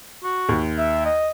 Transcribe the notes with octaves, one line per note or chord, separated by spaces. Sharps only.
F#4
D#2
E5
D#5